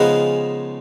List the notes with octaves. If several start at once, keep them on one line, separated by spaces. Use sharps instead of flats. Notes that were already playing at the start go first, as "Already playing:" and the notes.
Already playing: C#3 F3 G#3 B3 D#4 G#4 B4